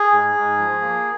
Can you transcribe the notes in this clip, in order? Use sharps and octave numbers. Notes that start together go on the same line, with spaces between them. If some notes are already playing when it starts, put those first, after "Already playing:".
Already playing: G#4
G#2
G#2
F3
A#3